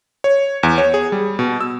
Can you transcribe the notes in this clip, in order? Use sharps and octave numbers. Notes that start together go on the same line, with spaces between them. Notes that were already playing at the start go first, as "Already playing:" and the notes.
C#5
E2
C#5
G#4
G3
B2
E6